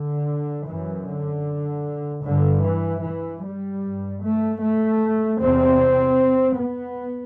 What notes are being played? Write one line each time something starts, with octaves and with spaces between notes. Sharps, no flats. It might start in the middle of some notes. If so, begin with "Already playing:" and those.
Already playing: D3
F#2 E3
D3
G2 D3
E3
E3
G3
G2
A3
A3
E2 C3 C4
B3